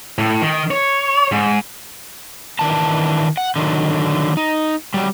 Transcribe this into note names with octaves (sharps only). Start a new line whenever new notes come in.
A2
D#3
C#5
G#2
D#3 E3 D4 A5
F#5
D3 D#3 F#3
D#4
F#3 G3